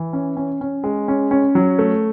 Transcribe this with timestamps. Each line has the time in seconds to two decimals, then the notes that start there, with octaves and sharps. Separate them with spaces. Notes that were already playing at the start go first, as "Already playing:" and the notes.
Already playing: E3
0.13 C#4
0.37 C#4
0.61 C#4
0.84 G#3
1.08 C#4
1.31 C#4
1.55 F#3
1.79 A3